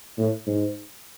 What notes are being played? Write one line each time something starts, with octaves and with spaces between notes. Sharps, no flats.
A2
G#2